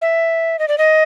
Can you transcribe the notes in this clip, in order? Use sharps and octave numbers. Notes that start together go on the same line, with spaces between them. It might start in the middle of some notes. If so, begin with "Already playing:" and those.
E5
D#5
D5
D#5